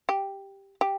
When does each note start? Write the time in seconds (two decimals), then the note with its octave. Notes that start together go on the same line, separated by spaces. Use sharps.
0.09 G4
0.81 G4